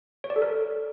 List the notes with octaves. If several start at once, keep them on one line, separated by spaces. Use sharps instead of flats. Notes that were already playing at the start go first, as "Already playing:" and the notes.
C#5
D5
A4
A#4